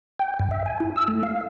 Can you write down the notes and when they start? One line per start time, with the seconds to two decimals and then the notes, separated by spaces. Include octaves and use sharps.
0.19 G5
0.39 G2
0.51 E5
0.66 G#5
0.80 E4
0.96 E6
1.08 A3
1.23 F5